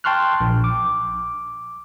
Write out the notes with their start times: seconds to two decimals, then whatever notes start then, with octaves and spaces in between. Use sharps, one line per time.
0.04 G5 A5 C6 C#6 F6 F#6
0.41 A#1
0.64 D6